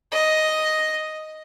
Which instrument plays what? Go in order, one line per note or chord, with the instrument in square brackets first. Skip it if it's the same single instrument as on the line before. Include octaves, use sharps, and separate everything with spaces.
[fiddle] D#5